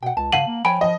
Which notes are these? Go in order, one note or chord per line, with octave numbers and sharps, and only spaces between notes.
B2 F#5 G5
C#2 A5
C#3 F5 F#5 D#7 F#7
A#3
F3 C#5 G5 G#5 B5 D7
F3 D#5